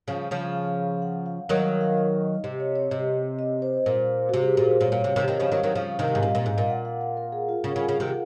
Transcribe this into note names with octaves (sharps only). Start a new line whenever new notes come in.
C#3 F3
C#3 F3
F5
F#5
F5
D#3 F#3 D#5
F5
F5
D#5
C3 D#5
C#5
C#5
C3 D#5
D#5
C5
A#2
C3 F#4
G#4
A#2 A#4
C5
A#2 C#5
A#2
C3
C3 D#3
C3 D#3 D#5
C#3 F3
D#3 F#3
D#3 F#3
C#3 F3 F5
C3 D#3 D#5
G#2
A#2 F5
D#5
A#2 F5
G#2
A#2
F#5
F5
F5
A#4
G#4
F4
C#3
C#3
C#3
C3 D#3